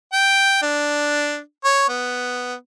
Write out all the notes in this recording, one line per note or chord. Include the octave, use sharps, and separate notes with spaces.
G5
D4
C#5
B3